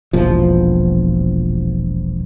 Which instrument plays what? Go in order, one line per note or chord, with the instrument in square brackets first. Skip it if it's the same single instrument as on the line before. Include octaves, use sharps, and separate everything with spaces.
[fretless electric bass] E1 A#1 F3